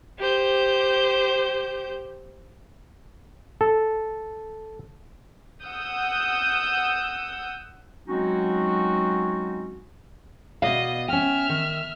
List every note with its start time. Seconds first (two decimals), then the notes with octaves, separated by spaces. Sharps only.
0.19 G4 C5 G6
3.61 A4
5.64 F#5 D#6 E6 G6
8.08 F#3 G#3 C4 C#4 D#4 F#4
10.62 B2 D5 D#5 F5
11.08 C#4 E5 G5 F6
11.49 D#3